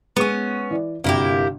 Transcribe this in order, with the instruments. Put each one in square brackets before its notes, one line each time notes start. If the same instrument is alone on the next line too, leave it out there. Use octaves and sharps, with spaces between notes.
[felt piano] G#3 C#6 [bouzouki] B3 C#4
[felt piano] E3 D5
[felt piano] G1 C3 F#4 [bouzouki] A#3 E4 G4